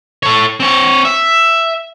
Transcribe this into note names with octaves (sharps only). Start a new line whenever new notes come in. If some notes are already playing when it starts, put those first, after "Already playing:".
A4 C#5
C4 C#5
E5